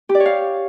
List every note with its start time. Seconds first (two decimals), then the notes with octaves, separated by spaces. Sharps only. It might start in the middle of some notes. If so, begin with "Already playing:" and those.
0.09 G4
0.15 D5
0.20 C#5
0.26 F5